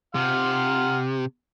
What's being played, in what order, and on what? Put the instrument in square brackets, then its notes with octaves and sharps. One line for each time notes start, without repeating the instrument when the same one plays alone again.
[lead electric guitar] C3 [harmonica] F#5 C6 F6